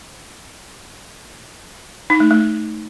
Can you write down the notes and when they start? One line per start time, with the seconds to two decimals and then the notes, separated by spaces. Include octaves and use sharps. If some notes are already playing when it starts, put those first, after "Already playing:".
2.10 D#4
2.20 A3
2.31 A3